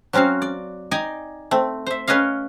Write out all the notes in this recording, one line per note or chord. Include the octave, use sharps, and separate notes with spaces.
F#3 C4 C#4 F#4 F5
D5
D#4 D5 G5 G#5 A#5
A3 C4
C5 E5
C#4 B4 C#5 D#5 F5